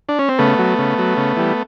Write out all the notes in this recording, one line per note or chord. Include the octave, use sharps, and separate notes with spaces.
D4
C#4
C4
C#3 A3 B3
F#3
C#3
F#3
C#3
E3 G3